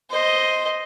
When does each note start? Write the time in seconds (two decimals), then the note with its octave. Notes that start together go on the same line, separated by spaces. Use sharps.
0.10 C5 D#5